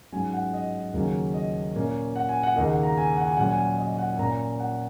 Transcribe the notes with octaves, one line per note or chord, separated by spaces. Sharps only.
G#2 F#3 C#4 G#5
F#5
D#5
D#2 C#3 F#3 A#3 C#4
D#5
A#2 A#3 C#4
F#5
G#5
F#5
D#2 C#3 A#3 D#5
F#5
A#5
G#5
F#5
G#5
A#2 F#3 C#4 F#5
G#5
F#5
D#5
F#5
A#2 A#3 C#4 A#5
F#5